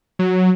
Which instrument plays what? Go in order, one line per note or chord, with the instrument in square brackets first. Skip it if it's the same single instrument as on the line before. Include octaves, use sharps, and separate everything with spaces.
[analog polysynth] F#3